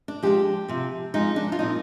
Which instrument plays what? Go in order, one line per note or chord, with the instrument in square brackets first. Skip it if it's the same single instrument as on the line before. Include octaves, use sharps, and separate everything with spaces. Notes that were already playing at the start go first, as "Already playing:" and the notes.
[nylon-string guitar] D4
F3 G#3 D4 G4
C3 F3 C4
F3 G#3 C4 D#4
D4
F4
A#2 F3 C4 D#4